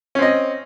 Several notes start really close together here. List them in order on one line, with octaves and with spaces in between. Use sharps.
C#4 C4 D#5